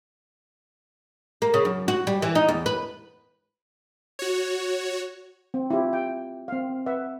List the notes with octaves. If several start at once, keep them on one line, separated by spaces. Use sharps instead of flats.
A#3
C#3
F#2
F#4
G3
E3
D#4
E2
B4
F#4 C#5
C4
E4 F4 G4
G5
C4 F5
B4 E5 F#5